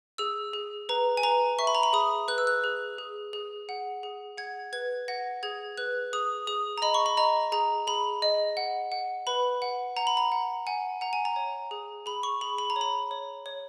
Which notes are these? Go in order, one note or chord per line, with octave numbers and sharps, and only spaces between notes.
G#4 E6
G#4
B4 A#5
G#5
B4 A#5
E5 C#6
B5
A#5
B5
G#4 D#6
B4 F#6
E6
F#6
G#4
G#4
G#4
F#5
G#4
F#5 G#6
B4 G#6
F#5 A#6
G#4 G#6
B4 F#6
G#4 D#6
G#4 D#6
A#5
D#5 B5
C#6
B5
D#5 A#5
G#4 A#5
G#4 B5
D#5
F#5
F#5
B4 B5
F#5
F#5 A#5
B5
A#5
F#5
F#5 G#5
F#5 A#5
G#5
A#5
C#5
G#4
G#4 B5
C#6
G#4 B5
B5
A#5
C#5
B5
C#5
C#5